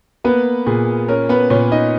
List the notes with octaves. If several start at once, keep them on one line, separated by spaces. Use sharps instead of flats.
A#3 B3 B4
A#2 G#4
C#4 A#4
B3 B4
A#2 C#4 C#5
D#4 D#5